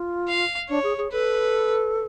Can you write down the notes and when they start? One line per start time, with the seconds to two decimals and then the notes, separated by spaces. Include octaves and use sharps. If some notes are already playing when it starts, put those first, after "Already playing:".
Already playing: F4
0.28 F5
0.70 D4 C#5
0.84 G#4
0.98 G#4
1.12 A4 B4